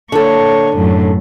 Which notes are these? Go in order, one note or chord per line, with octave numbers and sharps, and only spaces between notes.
D3 A#3 A4 C#5
F#2 A2